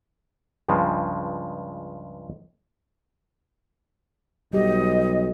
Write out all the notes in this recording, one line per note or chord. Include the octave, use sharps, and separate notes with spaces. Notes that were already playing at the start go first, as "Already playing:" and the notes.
C#2 G2 C#3 F3 G#3
B1 G3 G4 D#5